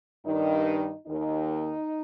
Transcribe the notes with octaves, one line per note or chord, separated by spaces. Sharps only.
G2 D#3 D#4
D#2 D#3 D#4